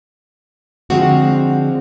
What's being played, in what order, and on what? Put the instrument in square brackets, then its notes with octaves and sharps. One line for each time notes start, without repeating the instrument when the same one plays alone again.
[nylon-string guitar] D3 F3 G#3 C4 F#4